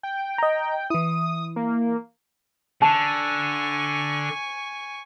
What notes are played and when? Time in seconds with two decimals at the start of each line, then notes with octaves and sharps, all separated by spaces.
0.03 G5
0.38 D#5 A#5
0.90 E3 E4 D#6
1.56 A#3
2.82 D3 G#5 A5 C#6